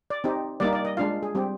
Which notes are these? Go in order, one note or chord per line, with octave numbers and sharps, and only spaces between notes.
D5
C4 D#4 G4
G3 A#3 D#4 D5
D5
D#5
G#3 D4 F4 F5
G#4
G3 C4 G4